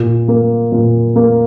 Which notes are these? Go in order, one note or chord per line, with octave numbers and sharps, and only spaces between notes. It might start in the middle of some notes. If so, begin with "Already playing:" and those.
Already playing: A#2
A#3
A#2
A#3